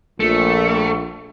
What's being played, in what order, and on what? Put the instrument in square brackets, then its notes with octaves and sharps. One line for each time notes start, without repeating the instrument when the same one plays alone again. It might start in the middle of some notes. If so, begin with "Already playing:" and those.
[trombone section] A#1 [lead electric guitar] A3